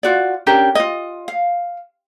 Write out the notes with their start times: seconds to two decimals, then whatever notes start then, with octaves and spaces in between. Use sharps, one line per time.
0.03 F4 F#4 D5
0.46 C#4 D4 G4 A#4
0.75 F4 D#5
1.28 F5